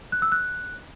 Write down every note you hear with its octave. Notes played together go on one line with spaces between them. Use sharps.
F#6
E6
F#6